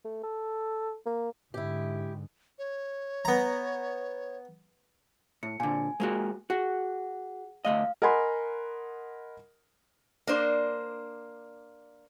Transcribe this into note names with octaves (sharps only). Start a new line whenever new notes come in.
A3
A4
A#3
G#2 D3 E4 G4
C#5
B3 A#5
A2 C#7
A#2 D3 G#5
G#3 A#3 F#4
F#4 G#4 F#5
D2 A3 D#5 F5
A#4 D#5 F#5 G#5 B5 C6
A#3 D4 C5